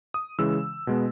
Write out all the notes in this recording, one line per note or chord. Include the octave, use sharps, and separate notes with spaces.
D#6
C#3 E3 G#3 E6
B2 G#3 B3